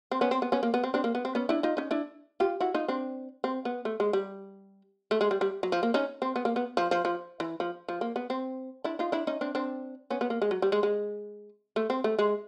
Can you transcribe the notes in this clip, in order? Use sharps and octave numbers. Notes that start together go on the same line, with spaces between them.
C4
B3 C#4
C4
B3
B3 C#4
A#3
B3
C4
C4 D4
A#3
B3
C4
B3 C#4
D4 E4
D#4 F4
C#4 D#4
D4 E4
F4 G4
E4 F#4
D#4 F4
C4 D4
C4
B3
A3
G#3
G3
A3
G#3
G3
G3
F#3
F3
A#3
C#4 D#4
C4
B3
A#3
B3
F3
F3
F3
E3
F3
F3
A#3
B3
C4
D4 E4
D#4 F4
D4 E4
C#4 D#4
C4 D4
C4 D4
B3 C#4
B3
A#3
G#3
F#3
G3
G#3
G#3
A3
C4
A3
G#3